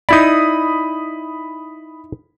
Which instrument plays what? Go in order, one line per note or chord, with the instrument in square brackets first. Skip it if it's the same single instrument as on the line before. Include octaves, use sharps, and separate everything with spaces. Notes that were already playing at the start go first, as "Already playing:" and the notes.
[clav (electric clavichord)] D#4 E4 D5 [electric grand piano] B5 D#6